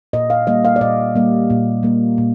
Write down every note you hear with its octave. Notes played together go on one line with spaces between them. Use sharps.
A#2 D#5
F5
G3 A#3 D#5
F5
D5
A#2 D#5
G3 A#3
A#2
G3 A#3
A#2